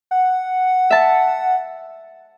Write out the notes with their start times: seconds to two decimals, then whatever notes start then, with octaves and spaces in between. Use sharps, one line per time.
0.11 F#5
0.90 E5 A5